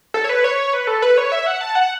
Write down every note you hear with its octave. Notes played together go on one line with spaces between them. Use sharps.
A4
C#5
B4
C#5
B4
A4
B4
C#5
E5
F#5
A5
F#5